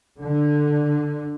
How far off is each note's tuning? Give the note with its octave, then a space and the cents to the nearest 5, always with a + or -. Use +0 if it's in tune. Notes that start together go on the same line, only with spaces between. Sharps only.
D3 +10